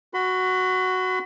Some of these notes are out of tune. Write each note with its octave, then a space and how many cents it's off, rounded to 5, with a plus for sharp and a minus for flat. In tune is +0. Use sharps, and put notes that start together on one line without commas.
F#4 +0 B5 +40